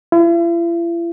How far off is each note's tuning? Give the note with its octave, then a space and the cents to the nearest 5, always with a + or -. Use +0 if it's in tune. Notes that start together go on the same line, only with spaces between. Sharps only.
E4 +45